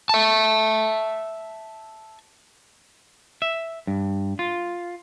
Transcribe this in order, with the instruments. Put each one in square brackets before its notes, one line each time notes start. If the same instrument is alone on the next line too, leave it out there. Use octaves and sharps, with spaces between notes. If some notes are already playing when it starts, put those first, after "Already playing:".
[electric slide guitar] E5 A5
[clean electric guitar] E5
G2
F4